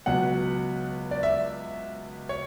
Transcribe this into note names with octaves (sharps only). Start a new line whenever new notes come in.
C#2 B2 F#3 F#5
D5
E5
C#5